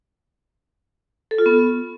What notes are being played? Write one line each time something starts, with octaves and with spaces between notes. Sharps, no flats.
A4
F4
B3